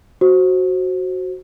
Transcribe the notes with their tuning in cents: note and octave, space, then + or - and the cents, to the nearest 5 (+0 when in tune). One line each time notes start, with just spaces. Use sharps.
F#4 +0 C5 +10